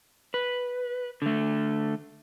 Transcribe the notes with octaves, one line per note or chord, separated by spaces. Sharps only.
B4
D3 A3